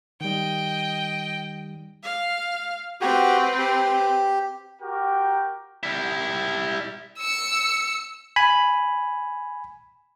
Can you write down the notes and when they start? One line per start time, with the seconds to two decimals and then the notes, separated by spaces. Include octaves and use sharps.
0.21 D#3 G3 D#5 G5
2.03 F5
3.01 C4 F#4 G4 B4
3.59 G4
4.81 F#4 G4 A#4 G5
5.83 G3 E4
7.18 E6 C#7
8.36 G#5 B5